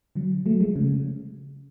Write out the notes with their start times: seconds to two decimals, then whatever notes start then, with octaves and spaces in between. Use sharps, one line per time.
0.15 D3 F#3
0.46 F#3 A3
0.60 F3 G#3
0.76 C#3